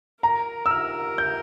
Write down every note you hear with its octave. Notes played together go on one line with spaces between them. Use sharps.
A#4 A#5
E6
F6
G6